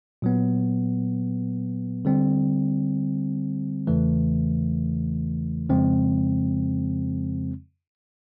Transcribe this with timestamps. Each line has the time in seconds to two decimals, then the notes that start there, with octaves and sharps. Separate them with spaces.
0.22 A#2 F#3 B3
2.05 D3 G3 C4
3.87 E2 C#3 E3 A3
5.69 F2 C#3 F3 G#3 C4